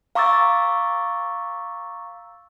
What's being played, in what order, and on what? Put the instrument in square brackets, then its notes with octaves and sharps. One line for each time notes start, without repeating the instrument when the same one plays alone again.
[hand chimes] F5 A#5 C#6 D6 E6 A6